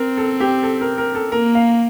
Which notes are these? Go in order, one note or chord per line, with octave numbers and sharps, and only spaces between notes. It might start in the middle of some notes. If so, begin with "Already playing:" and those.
Already playing: C4 A#4
A4
G4
A4
A#4
A#4
A4
A#3 A#4
F5